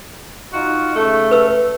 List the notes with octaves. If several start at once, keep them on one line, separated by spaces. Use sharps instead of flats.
D#4 F4 F#4
C#3 A3
B4 E6